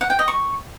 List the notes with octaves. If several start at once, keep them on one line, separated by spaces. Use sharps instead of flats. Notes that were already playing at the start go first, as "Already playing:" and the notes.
F#5
G5
D#5
C#6